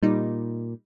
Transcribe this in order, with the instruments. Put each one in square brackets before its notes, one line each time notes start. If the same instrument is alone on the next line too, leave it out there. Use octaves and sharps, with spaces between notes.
[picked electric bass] A#2 [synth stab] G3 D#4